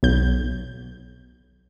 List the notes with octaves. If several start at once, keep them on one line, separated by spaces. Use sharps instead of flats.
B1 G6